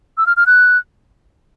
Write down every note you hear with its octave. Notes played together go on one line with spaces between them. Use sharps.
E6
F6
F6
F#6